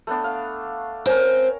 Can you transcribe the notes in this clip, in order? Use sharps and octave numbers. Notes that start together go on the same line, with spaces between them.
A3 B3 D4
F5
C4 C#4 A#4